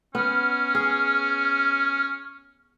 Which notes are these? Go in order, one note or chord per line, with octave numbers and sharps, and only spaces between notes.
B3 C#4 F6
G#4